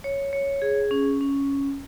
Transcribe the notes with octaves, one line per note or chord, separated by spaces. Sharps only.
C#5
C#5
G#4
C#4
C#4